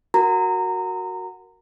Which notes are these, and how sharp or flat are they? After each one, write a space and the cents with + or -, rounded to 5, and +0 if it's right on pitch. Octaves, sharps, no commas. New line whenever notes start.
F#4 +0 A#4 +0 A#5 -20